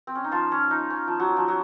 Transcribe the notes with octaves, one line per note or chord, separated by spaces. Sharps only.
C4
C#4
D#4
F3 F4
C#4
D#4
C#4
F3
F#3
F3
F#3